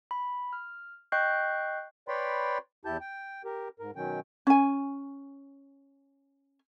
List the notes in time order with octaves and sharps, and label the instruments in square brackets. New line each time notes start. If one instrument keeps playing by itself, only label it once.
[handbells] B5
F6
D#5 G5 C#6 F#6 G6 C7
[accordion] B4 C#5 D5 G5 B5 C6
E2 E4 G4 A5 G6
G5
G4 A#4
G#2 A#4
B2 D#3 F#3 C#4 G5
[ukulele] C#4 G#5